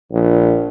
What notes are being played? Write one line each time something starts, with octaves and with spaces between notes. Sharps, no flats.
A#1